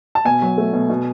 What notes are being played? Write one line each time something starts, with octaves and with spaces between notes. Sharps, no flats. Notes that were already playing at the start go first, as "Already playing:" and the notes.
A5
B2 G#5
F#3
A3
B2
B2